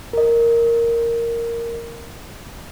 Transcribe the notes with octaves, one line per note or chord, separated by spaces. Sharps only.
A#4 D#5